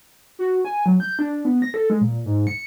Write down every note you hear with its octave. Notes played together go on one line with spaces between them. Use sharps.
F#4
G#5
F#3
G6
D4
B3
A#6
A4
G#3
A#2
G#2
C#7